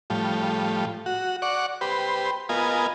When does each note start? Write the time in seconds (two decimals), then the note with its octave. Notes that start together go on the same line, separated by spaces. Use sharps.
0.10 A2 F3 G3
1.06 F#4
1.42 D5 F#5 C#6
1.81 G4 B4 C5
2.49 B3 F4 A#4 D#5 G#5